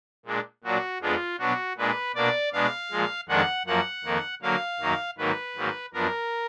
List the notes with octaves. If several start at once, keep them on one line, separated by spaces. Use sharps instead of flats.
A#2 G#3 D4
A#2 F#3 D4 F#4
F2 F3 G#3 B3 D4 F4
B2 F#3 B3 D4 F#4
A#2 G#3 D4 B4
B2 A#3 D4 D5
B2 G#3 B3 D4 F5
A#2 F3 G#3
F2 D#3 G#3 D4 F#5
F#2 F3 A#3 F#5
F2 D#3 A#3
D3 F#3 A#3 F5
F#2 D#3 F#3 A#3
G#2 D#3 F#3 A#3 B4
G#2 D#3 F#3 A#3
F#2 F3 B3 D4 A#4